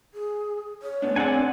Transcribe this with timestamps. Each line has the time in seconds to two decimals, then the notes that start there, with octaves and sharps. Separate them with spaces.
0.14 G#4
0.82 C#5
1.02 A2 B3 D4
1.16 C4 D4 G#4 D5 F#5 G#5